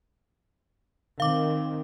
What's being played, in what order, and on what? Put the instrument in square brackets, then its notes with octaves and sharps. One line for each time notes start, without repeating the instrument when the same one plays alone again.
[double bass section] D#3 C4 [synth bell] F5 D6